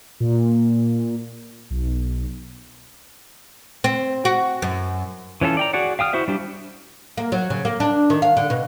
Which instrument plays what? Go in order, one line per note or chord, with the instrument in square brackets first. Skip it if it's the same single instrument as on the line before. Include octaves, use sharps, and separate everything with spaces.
[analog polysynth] A#2
B1
[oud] C4
F#4
F#2
[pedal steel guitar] E3 C#4 F4 A4
D5 G5 A#5
F#4 G#4 D5 F#5
F5 G5 D#6 F6
E4 F#4 C5 E5
G3 D4 G4
[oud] A#3
F#3
C#3
A#3
D4
D#3
F5
D3
B2